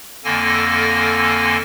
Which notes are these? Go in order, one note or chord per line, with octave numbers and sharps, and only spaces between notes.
F2 D3 A#3 A4 G#5 A#6